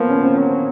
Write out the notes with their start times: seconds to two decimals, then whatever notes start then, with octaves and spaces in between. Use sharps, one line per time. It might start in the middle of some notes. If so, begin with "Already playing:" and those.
Already playing: F3 A#3 B3
0.09 C#4
0.24 C4
0.38 F#3